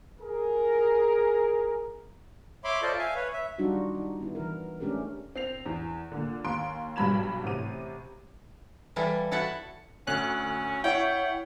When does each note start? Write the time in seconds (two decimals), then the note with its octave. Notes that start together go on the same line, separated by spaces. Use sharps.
0.20 G#4 A#4
2.64 C#5 E5 B5 C6 D6
2.82 F4 A4 C5 D5 D#5
2.99 E5 F5 G#5
3.15 B4 C#5
3.33 E5
3.58 G3 D4 D#4 F4 F#4
3.95 D#4
4.21 B3 E4
4.35 E3 A#4
4.80 G#3 A3 C#4 D4 G4 A#4
5.35 C4 C7 F7
5.66 E2
6.12 A#2 D3
6.44 D#2 C6 D7
6.96 B1 G2 G3 B5 G#6 E7
7.44 A1 C3 D#7
8.96 E3 G3 E4 F4 A4
9.31 E4 F#4 A4 E5 F#5 A5
10.07 D2 C#4 F#6
10.84 E4 C#5 F#5 G5